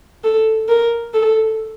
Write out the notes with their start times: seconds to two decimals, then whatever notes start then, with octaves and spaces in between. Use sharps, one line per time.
0.24 A4
0.69 A#4
1.14 A4